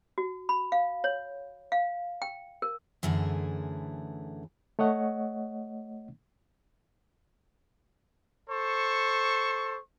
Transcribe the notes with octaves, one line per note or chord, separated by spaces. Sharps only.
F#4
B5
F5
C#5
F5
G5
A#4
F#2 D3 E3 A3 G#4
A3 C#5 D#5 F#5
A4 C5 C#6